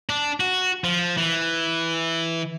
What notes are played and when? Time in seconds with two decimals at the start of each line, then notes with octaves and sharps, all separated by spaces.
0.09 D4
0.40 F#4
0.84 F3
1.17 E3